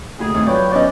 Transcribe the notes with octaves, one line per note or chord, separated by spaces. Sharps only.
F1 D2 G#4
D2 C3 D#3 G#3
F#3 F4 B4 C#5 D5 G5
B3 C#4 D5 D#5